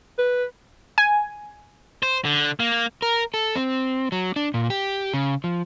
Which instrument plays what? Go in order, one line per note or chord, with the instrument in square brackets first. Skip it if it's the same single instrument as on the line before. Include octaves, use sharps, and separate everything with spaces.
[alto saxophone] B4
[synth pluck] G#5
[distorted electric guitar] C5
D3
A#3
[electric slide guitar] A#4
A4
C4
F#3
D4
A#2
G4
C#3
F3